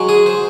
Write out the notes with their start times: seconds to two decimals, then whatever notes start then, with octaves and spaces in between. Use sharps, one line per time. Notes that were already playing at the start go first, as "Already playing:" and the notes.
Already playing: F#3 G#3
0.09 G#4
0.26 C5